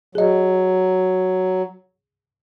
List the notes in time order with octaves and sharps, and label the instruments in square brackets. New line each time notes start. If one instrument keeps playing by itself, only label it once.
[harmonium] F#3 [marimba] G#4 D#5